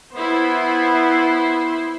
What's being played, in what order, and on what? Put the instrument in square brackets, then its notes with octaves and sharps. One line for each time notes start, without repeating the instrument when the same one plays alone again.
[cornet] B3 [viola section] E4 C5